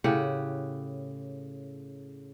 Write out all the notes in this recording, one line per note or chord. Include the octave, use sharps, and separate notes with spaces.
A2 C#3 G4 F#5